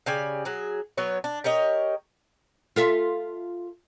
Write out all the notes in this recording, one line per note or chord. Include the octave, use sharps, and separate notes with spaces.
C#3 G4 D5 G#5
F#3 G#4
F#3 B3 C#5
D4
G4 A#4 C#5 D#5
F4 A4 E5